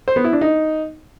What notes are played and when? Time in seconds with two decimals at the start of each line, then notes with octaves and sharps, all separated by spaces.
0.08 C5
0.16 B3
0.24 E4
0.33 D4
0.41 D#4